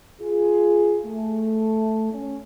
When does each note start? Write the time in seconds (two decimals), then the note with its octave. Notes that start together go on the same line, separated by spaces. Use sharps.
0.20 F4 G#4
1.06 A3
2.12 C#4